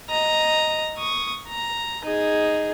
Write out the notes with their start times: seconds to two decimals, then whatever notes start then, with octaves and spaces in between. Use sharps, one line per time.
0.10 D#5 A#5
0.98 C#6 D#6
1.49 A#5
2.04 D#4 G#4